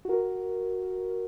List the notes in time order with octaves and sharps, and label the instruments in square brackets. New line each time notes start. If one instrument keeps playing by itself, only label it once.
[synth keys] F#4 A#4